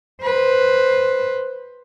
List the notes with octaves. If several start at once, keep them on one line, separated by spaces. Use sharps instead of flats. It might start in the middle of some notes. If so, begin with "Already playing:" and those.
B4 C5